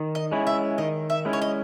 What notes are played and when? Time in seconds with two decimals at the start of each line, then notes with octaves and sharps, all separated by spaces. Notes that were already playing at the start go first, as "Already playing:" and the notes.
Already playing: D#3
0.15 D#5
0.31 G#3 C#4 E4
0.47 E5
0.78 D#3 D#5
1.10 E5
1.25 G#3 C#4 E4
1.33 C#5
1.42 D#5